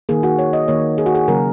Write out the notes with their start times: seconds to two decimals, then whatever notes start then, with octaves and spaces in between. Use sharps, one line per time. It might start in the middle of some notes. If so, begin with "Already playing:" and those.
0.09 D#3 A#3 G#4
0.23 F#4
0.39 C#5
0.53 D#5
0.68 D#3 A#3 C#5
0.98 G#4
1.06 F#4
1.15 G#4
1.28 C#3 F#3 A#3 A#4